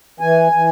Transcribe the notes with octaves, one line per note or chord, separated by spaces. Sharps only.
E3 G#5
E3